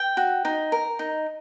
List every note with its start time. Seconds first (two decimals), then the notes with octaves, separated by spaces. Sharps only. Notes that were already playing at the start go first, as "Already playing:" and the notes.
Already playing: G5
0.17 F#4
0.45 D#4
0.72 A#4
0.99 D#4